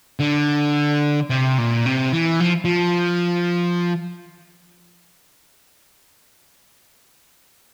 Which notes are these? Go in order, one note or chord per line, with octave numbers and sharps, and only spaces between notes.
D3
C3
A#2
C3
E3
F3
F3